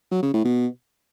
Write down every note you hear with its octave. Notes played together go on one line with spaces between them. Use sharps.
F#3
C#3
A2
B2